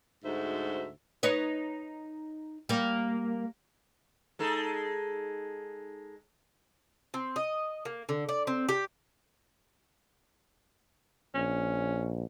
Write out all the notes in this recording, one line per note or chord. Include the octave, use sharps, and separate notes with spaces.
D2 G#2 D#4 F#4 C5 E5
D#4 B4 C#5
G3 A#3
G#3 D#4 A4
C4
D#5
A#3
D3
D5
C4
G4
A#1 C#4